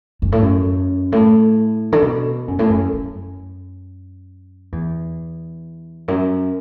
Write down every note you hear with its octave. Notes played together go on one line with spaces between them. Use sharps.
F#2
A2
F#2
A2
D3
B2
F#2
A2
F#2
F#2
E2
F#2